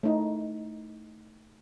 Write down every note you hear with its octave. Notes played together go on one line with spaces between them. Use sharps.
A3 D#4 E4